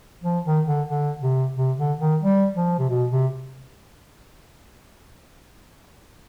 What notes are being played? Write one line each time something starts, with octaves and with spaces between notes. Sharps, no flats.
F3
D#3
D3
D3
C3
C3
D3
D#3
G3
F3
C3
B2
C3